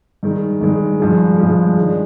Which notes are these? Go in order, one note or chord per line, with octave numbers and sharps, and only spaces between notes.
G2 D#3 G#3
G2 D#3 G#3
G2 F3 G#3
G2 F3 G#3
D#3 G#3 D4